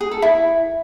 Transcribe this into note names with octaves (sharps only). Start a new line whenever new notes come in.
G#4
A4
E4